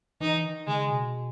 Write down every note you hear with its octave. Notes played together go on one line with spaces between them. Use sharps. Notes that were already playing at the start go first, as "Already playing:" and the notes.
E3 D#4
D#3
C#3 G#3
B2